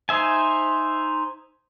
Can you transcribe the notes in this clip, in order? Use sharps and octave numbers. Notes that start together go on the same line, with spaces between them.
D#4 C5 E5 G#5